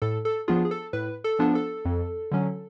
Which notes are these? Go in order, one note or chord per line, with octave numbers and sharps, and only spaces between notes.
A2 A4
A4
F3 B3 D4 F4 G#4
G#4
A4
A2 B4
A4
F3 B3 D4 F4
A4
F2
D3 F#3 C#4